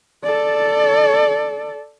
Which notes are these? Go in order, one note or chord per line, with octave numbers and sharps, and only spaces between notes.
A4 D5